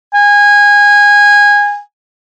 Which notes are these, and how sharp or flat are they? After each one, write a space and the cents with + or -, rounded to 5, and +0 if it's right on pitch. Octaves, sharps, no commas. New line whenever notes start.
G#5 -20